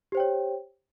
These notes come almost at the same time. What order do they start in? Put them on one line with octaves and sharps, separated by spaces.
G4 C5 G5 C#5